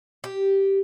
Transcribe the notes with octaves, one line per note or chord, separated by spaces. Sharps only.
G4